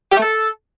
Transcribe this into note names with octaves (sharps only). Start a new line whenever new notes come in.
G4
A3
A4